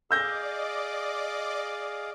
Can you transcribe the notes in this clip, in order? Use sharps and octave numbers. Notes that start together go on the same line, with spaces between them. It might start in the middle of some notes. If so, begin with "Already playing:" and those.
G#4 D5 D#5 F5 D6 E6 G6 A#6